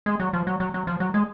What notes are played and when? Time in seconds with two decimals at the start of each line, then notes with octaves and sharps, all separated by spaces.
0.06 G#3
0.20 F#3
0.33 F3
0.47 F#3
0.60 F#3
0.74 F#3
0.87 F3
1.00 F#3
1.14 G#3